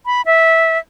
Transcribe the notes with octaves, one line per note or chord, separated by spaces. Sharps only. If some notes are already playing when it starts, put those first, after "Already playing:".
B5
E5